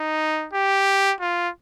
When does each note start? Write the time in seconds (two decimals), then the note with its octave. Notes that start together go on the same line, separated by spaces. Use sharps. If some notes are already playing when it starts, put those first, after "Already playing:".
Already playing: D#4
0.53 G4
1.21 F4